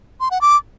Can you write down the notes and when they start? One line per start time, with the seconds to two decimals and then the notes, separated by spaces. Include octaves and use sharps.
0.20 C6
0.31 F#5
0.41 D6